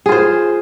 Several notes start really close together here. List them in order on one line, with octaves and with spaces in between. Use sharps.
G#4 F4 C5